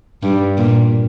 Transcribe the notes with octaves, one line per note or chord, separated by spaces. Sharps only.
G2
A#2